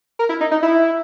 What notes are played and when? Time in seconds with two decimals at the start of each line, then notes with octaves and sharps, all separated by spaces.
0.19 A#4
0.29 E4
0.41 D#4
0.51 D#4
0.63 E4